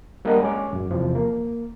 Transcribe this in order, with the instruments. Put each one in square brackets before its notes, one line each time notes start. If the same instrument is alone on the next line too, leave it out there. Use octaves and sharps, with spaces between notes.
[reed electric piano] G3 A#3 D4 A#4 D#5 F#5
G#3 C#4 C#5 D6
F#2
E2 C3 F3
A#3